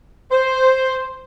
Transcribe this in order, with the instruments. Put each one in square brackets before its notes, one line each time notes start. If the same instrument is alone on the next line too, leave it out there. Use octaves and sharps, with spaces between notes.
[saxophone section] C5